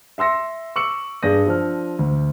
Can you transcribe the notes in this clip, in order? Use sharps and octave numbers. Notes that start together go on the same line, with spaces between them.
E5 C6 E6 A#6 C#7
C#6 D6 E6 C#7 F#7
G2 G#4 D5 G6 A#6 D#7
F3 D4 C5 F6
D2